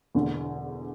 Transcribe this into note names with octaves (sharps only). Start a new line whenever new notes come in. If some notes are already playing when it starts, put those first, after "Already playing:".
E1 E2 D3